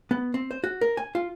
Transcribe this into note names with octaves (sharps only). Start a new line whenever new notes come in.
B3
C4
C5
F#4
A#4
G#5
F4